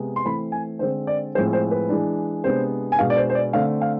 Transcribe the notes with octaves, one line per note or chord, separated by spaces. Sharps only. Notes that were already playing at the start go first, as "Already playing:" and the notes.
Already playing: C3 G#3 B3
C6
E3 A3 C4 B5
G#5
D3 G#3 C4 C5
D5
A2 F3 G#3 C4 C5
C5
B4
E3 G#3 D4
C3 G#3 B3 D4 C5
G#5
B2 G#3 B3 D4 F5
D5
C5
C5
D5
D3 A3 C4 F5
F5